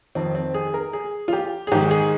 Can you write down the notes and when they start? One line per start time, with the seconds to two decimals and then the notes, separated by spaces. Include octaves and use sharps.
0.15 F2 D#3 C4
0.35 C4
0.54 G#4
0.74 A#4
0.93 G#4
1.28 F4
1.33 G4
1.67 G#4
1.72 G#2 D#3 G4
1.91 G#4